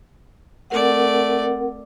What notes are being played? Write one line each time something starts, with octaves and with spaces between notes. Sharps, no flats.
A3 C4 A#4 D5 F#5